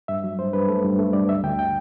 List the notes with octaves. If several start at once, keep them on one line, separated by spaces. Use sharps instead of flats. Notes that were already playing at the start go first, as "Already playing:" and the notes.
G2 E5
F#3
G2 C5
G2 B4
A3 A4
G2
A3
G2 D5
D2 E5
D2 G5
G5